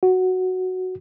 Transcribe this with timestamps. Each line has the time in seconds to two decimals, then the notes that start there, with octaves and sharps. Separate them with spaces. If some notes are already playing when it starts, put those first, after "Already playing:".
0.03 F#4